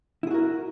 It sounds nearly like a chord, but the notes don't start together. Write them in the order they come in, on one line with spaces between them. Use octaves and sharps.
E4 G#4 F#4 A#4